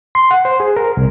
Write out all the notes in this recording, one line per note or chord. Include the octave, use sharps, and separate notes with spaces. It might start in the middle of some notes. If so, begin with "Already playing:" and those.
C6
F#5
C5
G#4
A#4
C2